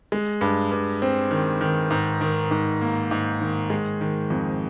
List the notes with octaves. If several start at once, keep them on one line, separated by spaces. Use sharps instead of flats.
G#3
G2
G2
C4
D#3
D#3
G#2
D#3
G#2
A#3
G#2
D#3
G#3
D#3
F2